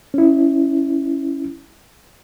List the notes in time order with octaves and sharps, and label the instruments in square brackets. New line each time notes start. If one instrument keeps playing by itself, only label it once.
[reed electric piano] C#4 E4